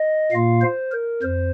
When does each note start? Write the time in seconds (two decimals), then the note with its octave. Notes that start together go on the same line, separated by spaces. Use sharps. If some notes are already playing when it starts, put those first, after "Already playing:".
Already playing: D#5
0.31 A#2 A#3 F4 F5
0.62 C5
0.92 A#4
1.22 F2 C5